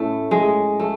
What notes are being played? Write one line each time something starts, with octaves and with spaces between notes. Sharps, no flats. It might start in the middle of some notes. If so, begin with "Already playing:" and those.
Already playing: A2 A3 C#4
G#3
A3